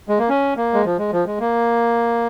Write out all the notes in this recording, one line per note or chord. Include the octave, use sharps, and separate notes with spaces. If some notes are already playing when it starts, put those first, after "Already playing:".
G#3
A#3
C#4
A#3
G#3
F3
G#3
F3
G#3
A#3